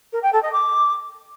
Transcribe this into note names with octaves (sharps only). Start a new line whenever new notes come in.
A#4
G5
A4
D#5
D6